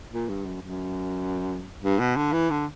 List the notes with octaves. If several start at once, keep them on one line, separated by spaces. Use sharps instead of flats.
A#2
G2
F#2
F#2
G2
B2
D3
E3
D3